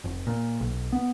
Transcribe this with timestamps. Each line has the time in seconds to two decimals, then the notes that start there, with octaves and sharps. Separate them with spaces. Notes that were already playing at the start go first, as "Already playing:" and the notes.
0.04 F1
0.27 A#2
0.60 B1
0.92 B3